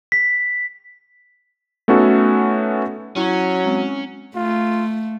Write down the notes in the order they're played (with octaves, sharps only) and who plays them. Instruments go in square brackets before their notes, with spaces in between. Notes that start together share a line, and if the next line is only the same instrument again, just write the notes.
[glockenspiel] B6
[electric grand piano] A3 B3 C#4 D#4 F#4 A4
[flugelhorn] F#3 [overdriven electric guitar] C#4 [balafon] E4
[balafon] G#3 C4
[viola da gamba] A3 [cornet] F4